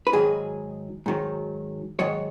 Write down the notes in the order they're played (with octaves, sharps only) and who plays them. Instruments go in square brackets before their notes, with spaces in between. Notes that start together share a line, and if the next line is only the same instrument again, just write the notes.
[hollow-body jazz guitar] B4
G#2 D#3 F#3 G#4
G#2 D#3 F#3
G#2 D#3 F#3 C#5